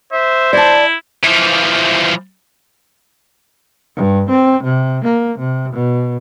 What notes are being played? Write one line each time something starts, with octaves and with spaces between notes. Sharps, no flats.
C5 E5
E4 D5 A5
E3 F3
G2
C4
C3
A#3
C3
B2